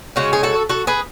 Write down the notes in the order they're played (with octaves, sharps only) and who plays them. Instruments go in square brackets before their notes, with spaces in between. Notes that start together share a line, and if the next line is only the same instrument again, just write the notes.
[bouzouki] C#3 G#3 C#4 F#4
G#4
F#4 A4
F#4 A4
G#4 B4